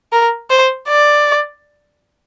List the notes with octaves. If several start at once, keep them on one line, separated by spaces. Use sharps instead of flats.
A#4
C5
D5